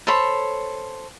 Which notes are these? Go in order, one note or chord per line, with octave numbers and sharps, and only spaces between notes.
A4 C5 C#5 B5